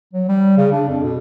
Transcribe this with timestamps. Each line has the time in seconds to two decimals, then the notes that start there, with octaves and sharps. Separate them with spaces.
0.14 F#3
0.29 G3
0.57 C#3
0.72 D4
0.89 F2
1.03 B2